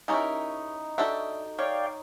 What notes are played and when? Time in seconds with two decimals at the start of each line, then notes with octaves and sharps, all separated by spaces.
0.08 C#3 C#4 D#4 E4 G4 A#4 C#6
0.98 D4 F#4 G4 A4 E5
1.59 C#5 D5 F5 G5